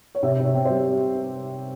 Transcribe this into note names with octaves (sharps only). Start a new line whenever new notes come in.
C#5
C3 E5
C3
C#5
C4
G3 C5